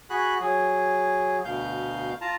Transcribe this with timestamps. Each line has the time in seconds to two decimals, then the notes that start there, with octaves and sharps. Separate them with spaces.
0.10 F#4 G#4 B5 F#6
0.41 F#3 G#4
1.45 D2 B2 F5 G6
2.21 F4 A5 A#5